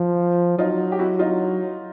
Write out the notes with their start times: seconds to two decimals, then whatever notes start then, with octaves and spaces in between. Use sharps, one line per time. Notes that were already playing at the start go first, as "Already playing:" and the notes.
Already playing: F3
0.58 F#3 D#4 F4
0.92 G4
0.99 E4 F#4
1.19 D#4 F4